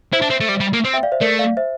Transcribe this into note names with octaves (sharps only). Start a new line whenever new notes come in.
E4 C5 E5
D4
C4
A3
G3
G3
A#3
C4 C5
E5 G5
D5 F5
C5 E5
A3 A#4 D5
D5 F5
C5 E5